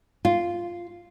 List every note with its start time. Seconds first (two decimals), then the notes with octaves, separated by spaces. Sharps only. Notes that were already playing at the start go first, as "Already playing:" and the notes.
0.25 F4